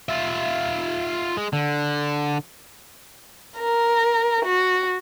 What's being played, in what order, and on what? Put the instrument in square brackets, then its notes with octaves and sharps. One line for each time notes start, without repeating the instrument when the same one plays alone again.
[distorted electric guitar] F4 E5
G#3
D3
[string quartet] A#4
F#4